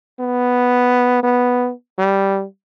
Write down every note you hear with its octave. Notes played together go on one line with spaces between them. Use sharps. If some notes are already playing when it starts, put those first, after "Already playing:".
B3
B3
G3